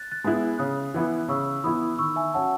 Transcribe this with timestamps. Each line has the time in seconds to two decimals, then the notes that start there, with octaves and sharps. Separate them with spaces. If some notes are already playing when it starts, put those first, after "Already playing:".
Already playing: F#6 A6
0.11 F#6 A6
0.24 G#3 B3 E4
0.58 C#3 D#6 F#6
0.94 E3 B3 E4
1.28 C#3 C#6 E6
1.64 E3 B3 E4 B5 D#6
1.98 D#3 C#6 E6
2.16 E5 G#5
2.34 F#3 C#4 F#5 A5